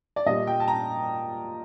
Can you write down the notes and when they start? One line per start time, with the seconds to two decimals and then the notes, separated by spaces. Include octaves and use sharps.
0.16 D5
0.26 A#2 G3 D#5
0.47 G5
0.60 A5
0.68 A#5